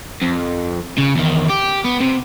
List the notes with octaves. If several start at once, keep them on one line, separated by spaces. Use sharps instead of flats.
F2
C#3
E2 D#3
G4
B3
C3